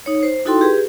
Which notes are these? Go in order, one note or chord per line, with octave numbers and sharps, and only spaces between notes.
D#4 C#5
C5
D#4 E4 F#4 A4 G5 C6
G4 G#4 B4